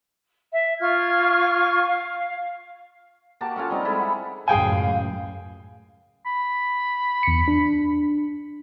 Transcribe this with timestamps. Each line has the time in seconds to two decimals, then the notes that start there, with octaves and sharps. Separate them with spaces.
0.51 E5
0.80 F4 C#6 F6 G#6
1.87 F5
3.41 A#3 F#4 G4 A5
3.56 C#4 F4 A4 F#5
3.70 G3 C4 D#4
3.85 G#3 E4 A4 B5
3.99 F#5
4.48 C#2 F#2 A2 G#4 F5 G5 G#5
6.26 B5
7.23 E2 C#7
7.48 D4